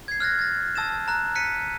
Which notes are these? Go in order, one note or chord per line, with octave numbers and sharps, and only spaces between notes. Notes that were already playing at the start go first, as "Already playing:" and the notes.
G#6 C7
F6 F#6 A6 A#6
A6 A#6
A5 E6 A6 A#6 E7
A#5 F#6
F#6 B6 C#7 D#7